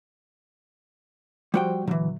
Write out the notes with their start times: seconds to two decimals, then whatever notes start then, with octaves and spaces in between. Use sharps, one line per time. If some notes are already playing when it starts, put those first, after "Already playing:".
1.54 F3 G3 F#4 C5 G5
1.88 D#2 A#2 D3 E3 F#3